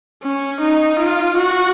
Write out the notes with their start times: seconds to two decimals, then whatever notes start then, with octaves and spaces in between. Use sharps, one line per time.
0.23 C#4
0.61 D#4
1.00 F4
1.38 F#4